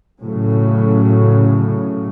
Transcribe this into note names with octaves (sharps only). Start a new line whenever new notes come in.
A2 C#3 F#3